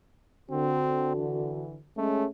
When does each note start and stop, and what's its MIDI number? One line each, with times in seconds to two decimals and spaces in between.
0.51 1.85 50
0.51 1.15 60
0.51 1.85 66
1.15 1.78 52
1.97 2.27 56
1.97 2.26 57
1.97 2.27 61